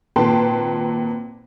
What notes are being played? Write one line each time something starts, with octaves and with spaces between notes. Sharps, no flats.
G#1 A#2 B4 G5 A5 C6